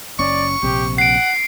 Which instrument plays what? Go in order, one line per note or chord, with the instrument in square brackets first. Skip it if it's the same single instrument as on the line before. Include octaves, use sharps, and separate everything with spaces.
[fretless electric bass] F#1 C#4 [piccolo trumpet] D5 [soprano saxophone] C#6
[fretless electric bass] A#1 C3 [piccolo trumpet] G4
[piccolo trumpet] F#5 [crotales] C7 D7